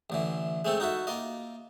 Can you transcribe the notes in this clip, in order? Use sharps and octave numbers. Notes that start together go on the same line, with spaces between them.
A1 D3 E3
G#3 A3 C4 A4
D#4 F#4 A4 E5
A#3 F4 D#5